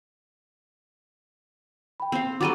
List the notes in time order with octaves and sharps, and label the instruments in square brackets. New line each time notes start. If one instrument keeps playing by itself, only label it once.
[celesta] G5 B5
[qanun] C4 F5
[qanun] F#3 G3 A4 [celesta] D6 A6 D#7